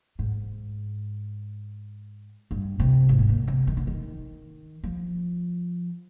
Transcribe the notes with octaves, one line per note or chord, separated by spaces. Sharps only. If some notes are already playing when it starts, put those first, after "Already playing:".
G#2
G2
C3
G#2
C3
A#2
C3
D#3
D3
D#3
F3